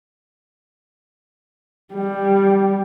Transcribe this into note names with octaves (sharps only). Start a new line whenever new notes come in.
G3